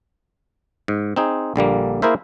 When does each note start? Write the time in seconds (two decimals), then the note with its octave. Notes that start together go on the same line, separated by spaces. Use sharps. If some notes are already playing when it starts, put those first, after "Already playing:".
0.88 G#2
1.16 C4 D#4 G#4
1.56 A#1 D3 G3 A#3
2.02 A#3 E4 G#4 A#4 C5 E5